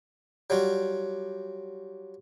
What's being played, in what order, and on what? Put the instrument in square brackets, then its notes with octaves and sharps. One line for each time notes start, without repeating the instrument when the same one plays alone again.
[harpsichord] F#3 G3 F4 F#4